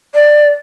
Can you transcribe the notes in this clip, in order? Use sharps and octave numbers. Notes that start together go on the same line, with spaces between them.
D5